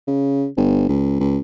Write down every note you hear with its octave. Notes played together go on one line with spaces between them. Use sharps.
C#3
G1
C#2
C#2